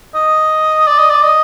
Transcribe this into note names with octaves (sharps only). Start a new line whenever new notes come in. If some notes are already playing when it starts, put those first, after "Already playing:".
D#5
D5
D#5
D5
D#5